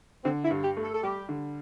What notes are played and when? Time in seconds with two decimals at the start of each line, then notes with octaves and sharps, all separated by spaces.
0.25 D3 C4
0.45 E4
0.51 G2
0.64 G4
0.77 A3
0.84 A4
0.95 A4
1.03 G3 G4
1.29 D3